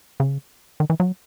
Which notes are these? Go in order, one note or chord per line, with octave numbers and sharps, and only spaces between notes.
C#3
D#3
E3
F#3